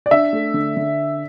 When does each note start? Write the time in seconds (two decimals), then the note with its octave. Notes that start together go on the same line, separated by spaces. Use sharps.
0.06 D5
0.11 D4 E5
0.33 A3
0.54 D3
0.77 D3